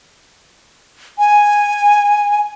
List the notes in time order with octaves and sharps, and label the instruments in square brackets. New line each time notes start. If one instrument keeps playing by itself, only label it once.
[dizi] G#5